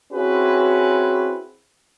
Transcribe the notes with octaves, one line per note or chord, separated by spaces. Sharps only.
C4 C#4 E4 F#4 G#4 B4